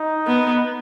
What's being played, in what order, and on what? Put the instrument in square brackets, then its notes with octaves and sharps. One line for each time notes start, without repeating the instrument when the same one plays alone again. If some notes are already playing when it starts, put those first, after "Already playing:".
Already playing: [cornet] D#4
[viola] B3